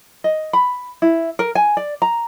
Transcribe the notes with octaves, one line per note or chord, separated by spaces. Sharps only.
D#5
B5
E4
A#4
G#5
D5
A#5